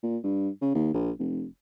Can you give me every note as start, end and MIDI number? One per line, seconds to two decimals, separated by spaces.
0.03 0.17 46
0.24 0.49 43
0.61 0.74 49
0.75 0.90 39
0.94 1.11 34
1.19 1.45 29